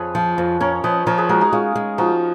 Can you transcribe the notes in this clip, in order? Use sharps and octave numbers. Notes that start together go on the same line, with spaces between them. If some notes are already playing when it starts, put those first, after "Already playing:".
Already playing: F2 G#4 B4 C#5
F3
F2
C#4 A#4 C#5
F3 B4 D#5
F3 A#4 C#5
G#4 B4
G#3 F#4 A#4
D#4 F#4
G#3 C#4 F4
G#3
F3 D#4 F#4